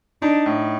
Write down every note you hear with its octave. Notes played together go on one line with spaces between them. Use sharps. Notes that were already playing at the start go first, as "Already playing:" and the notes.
D4 D#4
A2